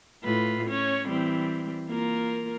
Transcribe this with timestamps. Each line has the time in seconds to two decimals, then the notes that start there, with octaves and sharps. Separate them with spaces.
0.24 A2 F4 B4
0.67 C#4 C#5
1.07 E3 G3 C4
1.88 A#3 F4 A#4